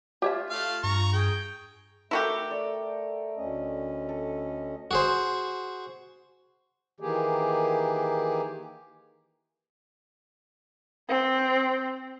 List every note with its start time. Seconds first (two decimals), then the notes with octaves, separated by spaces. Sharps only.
0.22 F4 G4 C#5 E5
0.50 A3 F5
0.83 G2 A#5 C#6
1.13 G#4 G5
2.11 A3 E4 F#4 G4 A4 A#4 G5
2.51 D5
3.37 D2 C#4 D#5
4.09 A4
4.91 F#4 G#4 C5
7.00 D#3 E3 A#3 G4 G#4
11.09 C4